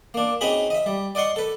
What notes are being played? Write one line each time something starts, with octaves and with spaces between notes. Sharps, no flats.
A#3 D4
C4 C#4 D#4 F#4 G#4 B5
D#5 E5
G3
D5 D#5 F#5 C6 C#6
A4 B4